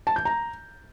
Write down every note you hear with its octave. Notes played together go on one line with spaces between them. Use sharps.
A5
G6
A#5